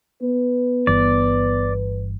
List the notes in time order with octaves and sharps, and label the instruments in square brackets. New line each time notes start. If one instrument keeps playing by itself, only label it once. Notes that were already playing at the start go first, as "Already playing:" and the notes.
[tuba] B3 [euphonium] B4
[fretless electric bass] G1 G2 E3 [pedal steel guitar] D5